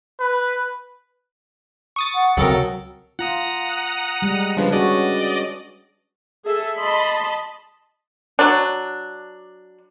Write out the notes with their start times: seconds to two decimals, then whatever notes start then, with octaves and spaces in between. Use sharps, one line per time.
0.20 B4
1.96 C#6 D#6 A6
2.14 F#5
2.37 C#2 C3 F#3 A4 A#4
3.19 F4 F#5 A#5 D#6
4.22 G3 G#3
4.57 C#3 F3 G3 D4 B4
4.72 C#4 F#4 G#4 D5 D#5
6.45 G#4 A4 E5
6.78 D#5 A5 B5 C6
8.39 F#3 D4